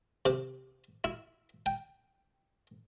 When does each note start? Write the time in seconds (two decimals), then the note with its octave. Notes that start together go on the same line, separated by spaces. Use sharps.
0.26 C3
1.04 E4
1.66 G5